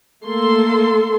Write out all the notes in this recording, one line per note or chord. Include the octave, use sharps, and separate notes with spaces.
A3 A#3 A4 C6